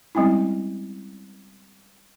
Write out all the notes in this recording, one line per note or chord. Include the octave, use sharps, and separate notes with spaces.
G3 G#3 C4 C#4 E4